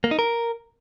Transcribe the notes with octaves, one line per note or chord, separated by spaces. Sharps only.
A#3
D#4
A#4